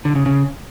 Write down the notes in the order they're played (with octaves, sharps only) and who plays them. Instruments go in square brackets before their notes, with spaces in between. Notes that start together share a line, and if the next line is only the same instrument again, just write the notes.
[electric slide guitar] D3
C#3
C#3